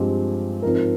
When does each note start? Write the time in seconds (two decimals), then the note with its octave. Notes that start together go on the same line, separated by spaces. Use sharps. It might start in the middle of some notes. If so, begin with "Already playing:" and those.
Already playing: G2 F3 G#3 C4 G4
0.62 G#2 F3 C4 A#4